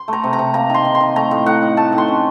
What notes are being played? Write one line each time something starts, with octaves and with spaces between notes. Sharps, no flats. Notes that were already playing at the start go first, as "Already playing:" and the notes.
Already playing: C6
A3 A#5
C3
A#5
C3
A#3 A#5
D#3 C6
D#3
C6
D#3
A3 A#5
A2
A2 F#5
D#4
A3 A5
D#3
C6
C#4